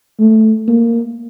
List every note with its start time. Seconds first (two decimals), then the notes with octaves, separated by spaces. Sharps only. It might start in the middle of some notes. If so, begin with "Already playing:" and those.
0.19 A3
0.68 A#3